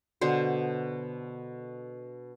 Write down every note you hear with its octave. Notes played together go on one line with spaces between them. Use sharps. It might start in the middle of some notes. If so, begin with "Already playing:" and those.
B2 D3 C5